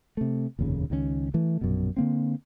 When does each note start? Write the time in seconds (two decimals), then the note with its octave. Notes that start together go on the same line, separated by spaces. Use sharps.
0.17 C3 A3
0.59 F1 D#2 A#2 C#3
0.90 C#2 D#3 F#3 C#4
1.34 E3 A3
1.61 A#1 F#2 B2
1.97 D3 A#3 C4